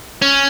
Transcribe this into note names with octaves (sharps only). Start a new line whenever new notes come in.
C#4